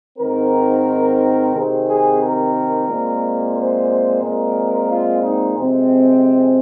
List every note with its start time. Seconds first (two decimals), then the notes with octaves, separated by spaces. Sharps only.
0.18 G#2 D#3 C4 A#4
1.53 C3 D#3 C4 G#4
1.87 G#4
2.21 A#4
2.87 A#2 G#3 C4
3.56 C5
4.22 A#2 G#3 C4 A#4
4.90 F4
5.23 D#4
5.58 F2 C3 G#3 C4